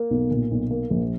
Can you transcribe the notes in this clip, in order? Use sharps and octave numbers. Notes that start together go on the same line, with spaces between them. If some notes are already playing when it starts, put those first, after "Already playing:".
Already playing: A#3
B1
A#2
B1
A#3
A#1